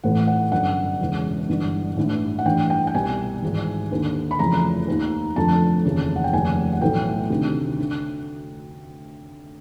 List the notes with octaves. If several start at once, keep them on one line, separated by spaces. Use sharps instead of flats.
A1 A2 E3 F#5
F#5
G1 F#2 D3 F#5
E1 E2 C#3 E3
G1 G2 E3
A1 G2 E3
F#5
A1 G2 E3 G5
G5
G5
C2 B2 G#5
G#1 G#2 E3
D#2 D3
B5
F1 F2 C#3 E3 A#5
D#2 D#3
F1 F2 D3 A5
F1 D#2 C#3 E3
F#5
G5
F1 D#2 C#3 G#5
F#5
B1 A2 E3 G5
D2 C3 D#3
D3